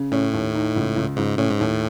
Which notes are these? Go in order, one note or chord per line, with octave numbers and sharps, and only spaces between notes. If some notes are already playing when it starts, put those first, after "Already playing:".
Already playing: C#3
A2 C#4
D#2
D#4
C#2
C#2
C#2 G#2
A2 C#4
G#2
D#2 A2